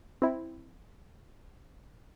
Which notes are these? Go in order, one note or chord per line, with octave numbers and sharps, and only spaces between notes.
C4 E4